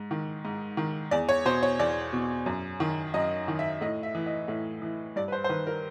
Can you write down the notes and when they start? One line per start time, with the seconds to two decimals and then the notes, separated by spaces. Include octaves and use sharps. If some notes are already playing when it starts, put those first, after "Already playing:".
Already playing: G#2
0.11 D#3
0.45 G#2
0.77 D#3
1.11 E2 D5
1.29 C#5
1.45 B2 C5
1.63 C#5
1.79 E2 D5
2.13 B2
2.46 F#2
2.80 D#3
3.14 F#2 D#5
3.48 D#3
3.59 E5
3.81 A2 D#5
4.03 E5
4.15 E3
4.26 D#5
4.48 A2
4.82 E3
5.16 G2 D5
5.28 B4
5.32 C5
5.44 C5
5.49 D#3 B4
5.67 A#4